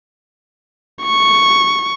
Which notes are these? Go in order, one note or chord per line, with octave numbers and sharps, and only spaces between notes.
C#6